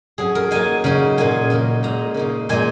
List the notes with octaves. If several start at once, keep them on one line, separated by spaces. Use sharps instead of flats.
F#3 C#4 G#4
A#4
F#3 A#3 D#4 G#5
C#3 F#3 D#4
A#2 A#3 D#4 G#5
C#3 F#3 A#3 D#4
A#2 G#3 D#4 A#5
C#3 A#3 D#4
A#2 G#3 D#4 G#5